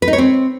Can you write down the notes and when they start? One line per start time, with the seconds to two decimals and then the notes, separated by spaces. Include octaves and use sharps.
0.02 B4
0.08 D#4
0.13 C#5
0.18 C4